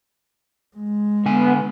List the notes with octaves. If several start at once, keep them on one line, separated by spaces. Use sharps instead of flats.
G#3
D3 B3 G#5